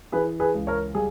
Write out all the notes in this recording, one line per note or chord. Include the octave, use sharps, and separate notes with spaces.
E3 G#4 B4
G#4 B4
C#2
A#4 C#5
G3 G#4